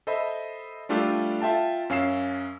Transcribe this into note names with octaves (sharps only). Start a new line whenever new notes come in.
A4 C5 D#5 E5 B5
G3 A3 D4 F4 G4 A4
F4 E5 G5 A5
F#2 C#4 F5 E6 C7 E7